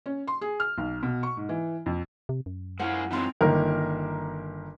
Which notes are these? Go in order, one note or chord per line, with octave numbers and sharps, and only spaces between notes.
C#4
C6
G#4
F6
B1
B2
C#6
G#2
E3
F2
C3
F#2
G#3 E4 F4 G#4 A#4 C5 F#5
E3 G#3 C4 D#4 F4 C#5
G1 D#3 A#3 A#4 F6